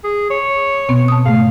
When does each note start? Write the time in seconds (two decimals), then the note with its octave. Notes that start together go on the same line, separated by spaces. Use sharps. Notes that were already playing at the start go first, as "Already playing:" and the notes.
0.04 G#4
0.30 C#5
0.89 B2 B3 C4
1.08 A5 D#6
1.26 G#2 C#3 A3 F5